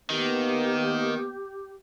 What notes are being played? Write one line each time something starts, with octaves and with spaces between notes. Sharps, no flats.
D#3 A#3 B3 G4